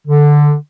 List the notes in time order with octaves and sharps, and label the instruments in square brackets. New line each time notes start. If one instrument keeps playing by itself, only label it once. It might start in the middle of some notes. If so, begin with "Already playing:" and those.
[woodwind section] D3